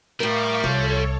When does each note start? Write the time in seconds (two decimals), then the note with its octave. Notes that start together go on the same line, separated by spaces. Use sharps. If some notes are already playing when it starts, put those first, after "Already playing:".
0.20 A2 G3 A#4 F5 C#6 D6
0.64 C2 F3 A4 C#5